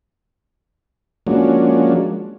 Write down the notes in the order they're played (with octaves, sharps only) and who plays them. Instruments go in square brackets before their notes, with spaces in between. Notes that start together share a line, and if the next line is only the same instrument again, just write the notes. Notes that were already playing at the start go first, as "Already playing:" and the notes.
[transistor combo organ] F3 G#3 A#3 C#4 D4 F#4